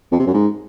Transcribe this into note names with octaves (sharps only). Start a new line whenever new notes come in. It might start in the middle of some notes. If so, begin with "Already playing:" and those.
F2
C3
F#2
G#2